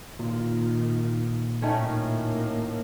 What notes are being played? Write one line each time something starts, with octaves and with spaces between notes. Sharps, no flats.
A#2 D#3 F4
A2 D#3 A3 A#3 C#4